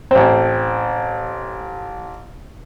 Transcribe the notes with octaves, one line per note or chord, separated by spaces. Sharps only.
A1 C4